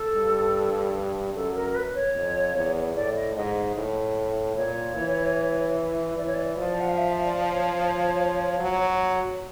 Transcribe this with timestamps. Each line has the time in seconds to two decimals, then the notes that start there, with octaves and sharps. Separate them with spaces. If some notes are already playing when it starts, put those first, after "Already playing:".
Already playing: A4
0.14 G2
1.34 F#2 A4
1.55 A#4
1.70 A#4
1.75 B4
1.95 C#5
2.15 F2
2.55 E2
2.95 A2 D5
3.16 D#5
3.35 G#2 D#5
3.76 A2
4.56 A#2 C#5
4.96 E3
6.17 E3 D5
6.26 C#5
6.34 D5
6.57 F3 D5
6.80 F#5
6.89 F5
6.98 E5
7.24 D5
7.51 C#5
8.59 F#3